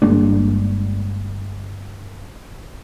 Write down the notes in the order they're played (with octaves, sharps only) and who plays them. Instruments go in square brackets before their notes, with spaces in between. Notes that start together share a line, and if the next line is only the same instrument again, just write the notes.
[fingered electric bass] G1 G#3 A#3 D4